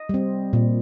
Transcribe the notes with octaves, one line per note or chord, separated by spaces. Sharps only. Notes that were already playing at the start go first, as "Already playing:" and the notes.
Already playing: D#5
G3 C4
A#2